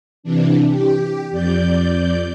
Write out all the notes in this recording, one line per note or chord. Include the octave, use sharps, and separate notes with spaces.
C3 E3 D4
G4
F2 D5 G6